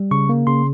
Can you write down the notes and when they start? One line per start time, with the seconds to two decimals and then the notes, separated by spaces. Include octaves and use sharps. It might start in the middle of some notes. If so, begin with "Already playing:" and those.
Already playing: G3
0.11 C#3 C#6
0.29 A#3
0.47 C#3 C6